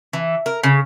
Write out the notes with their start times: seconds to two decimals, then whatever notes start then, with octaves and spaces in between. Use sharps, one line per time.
0.13 E3
0.46 A#4
0.63 C#3